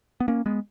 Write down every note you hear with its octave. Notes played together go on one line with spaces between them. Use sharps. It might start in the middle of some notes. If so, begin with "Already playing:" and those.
B3
A#3 C#4
G#3 B3